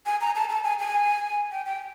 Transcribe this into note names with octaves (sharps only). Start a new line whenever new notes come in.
G#5
A#5
A5
A5
G#5
G#5
G5
G5